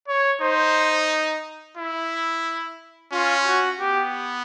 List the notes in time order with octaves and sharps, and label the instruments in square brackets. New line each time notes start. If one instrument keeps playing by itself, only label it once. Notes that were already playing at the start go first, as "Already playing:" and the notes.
[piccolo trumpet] C#5
[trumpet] D#4 [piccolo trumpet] C5
[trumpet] E4
[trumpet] C#4 [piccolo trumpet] F4
[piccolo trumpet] F#4
[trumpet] B3 [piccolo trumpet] G4